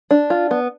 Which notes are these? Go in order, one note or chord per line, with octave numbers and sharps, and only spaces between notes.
D4
F4
B3